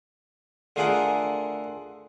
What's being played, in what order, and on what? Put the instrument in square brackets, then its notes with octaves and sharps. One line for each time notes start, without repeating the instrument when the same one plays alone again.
[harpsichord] D3 A3 F4 G#4 A#4 F#5